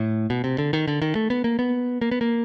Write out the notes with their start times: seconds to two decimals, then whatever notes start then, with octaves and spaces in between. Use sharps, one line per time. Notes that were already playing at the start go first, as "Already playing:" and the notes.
Already playing: A2
0.30 B2
0.44 C3
0.58 D3
0.73 D#3
0.87 D3
1.02 D#3
1.15 A3
1.30 B3
1.44 A#3
1.59 B3
2.01 A#3
2.11 B3
2.21 A#3